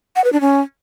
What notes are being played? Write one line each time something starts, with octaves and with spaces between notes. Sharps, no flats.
F#5
B4
D4
C#4